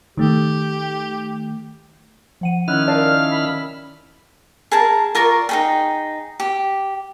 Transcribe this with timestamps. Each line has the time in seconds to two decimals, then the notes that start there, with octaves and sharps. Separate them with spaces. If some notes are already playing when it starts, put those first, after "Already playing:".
0.17 D#3 A3 G4
2.41 F3 F#5 D#7
2.68 D#3 C#4 E4 F6 F#6
2.87 A#4 D5 F5 A5
3.30 B5
4.72 G#4 A#4 A5
5.15 F4 A#4 D5 C#6
5.49 D#4 G#4 G5
6.40 G4